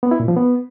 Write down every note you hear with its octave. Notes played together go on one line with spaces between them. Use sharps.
B3
E4
A#2
F3
B3